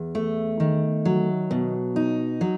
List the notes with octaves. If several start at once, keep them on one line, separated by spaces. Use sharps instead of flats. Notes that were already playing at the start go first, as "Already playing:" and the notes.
Already playing: E2
A3
D#3
F#3
B2
D#4
F#3